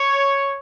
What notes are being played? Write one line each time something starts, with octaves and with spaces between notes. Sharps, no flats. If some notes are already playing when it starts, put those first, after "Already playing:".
Already playing: C#5